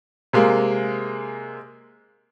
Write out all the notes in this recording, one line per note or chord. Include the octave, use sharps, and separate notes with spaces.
C3 G#3 A#3